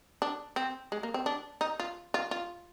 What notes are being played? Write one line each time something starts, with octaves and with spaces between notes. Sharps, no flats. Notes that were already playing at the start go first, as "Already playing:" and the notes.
D4
C4
G#3
A#3
C4
D4
D#4
F4
F4
F4